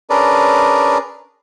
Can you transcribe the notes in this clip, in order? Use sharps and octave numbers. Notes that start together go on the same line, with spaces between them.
C#4 D4 G#4 A#4 B4 D5